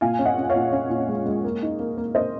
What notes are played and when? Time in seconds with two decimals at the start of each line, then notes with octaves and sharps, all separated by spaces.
0.01 A#2 F5 G#5
0.19 C#4
0.25 D#5 F#5
0.38 C#4
0.50 C#5 F5
0.56 A#2
0.73 C#4
0.90 A#2
1.09 G#3
1.26 G#3
1.44 A#3
1.62 D#4
1.79 A#3
1.97 A#3
2.15 A#3 C5 D#5